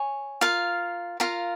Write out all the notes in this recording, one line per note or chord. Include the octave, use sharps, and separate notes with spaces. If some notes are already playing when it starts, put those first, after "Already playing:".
Already playing: C#5 G#5
F4 A#4 F5
F4 A#4 F5